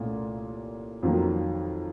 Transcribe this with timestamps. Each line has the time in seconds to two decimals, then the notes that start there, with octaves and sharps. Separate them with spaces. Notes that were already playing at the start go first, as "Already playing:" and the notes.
Already playing: C2 A#2 A3 C#4
1.02 F2 D#3 F#3 A#3